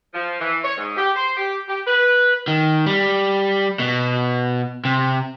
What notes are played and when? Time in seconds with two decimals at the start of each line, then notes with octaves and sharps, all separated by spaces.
0.14 F3
0.40 E3
0.64 C#5
0.78 G#2
0.97 G4
1.16 C5
1.36 G4
1.68 G4
1.86 B4
2.48 D#3
2.86 G3
3.80 B2
4.85 C3